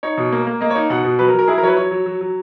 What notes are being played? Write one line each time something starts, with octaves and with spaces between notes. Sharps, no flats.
D#4 C#5
B2
A#3
A#3
A#3 D#5
C#5
D#4
B2 F#5
B2
F#3 B4
A#4
F#3
A#4
E4 G#4
A#4
F#3 B4 C#5
F#3 C#5
F#3
F#3
F#3